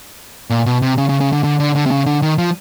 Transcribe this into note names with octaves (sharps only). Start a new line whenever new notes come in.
A#2
B2
C3
C#3
C#3
C#3
D3
D3
D3
D3
C3
C#3
D3
D#3
F3